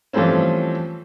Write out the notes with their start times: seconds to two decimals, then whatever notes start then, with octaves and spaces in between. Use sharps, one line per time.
0.13 E3 F3 G3 A3 C4 C#4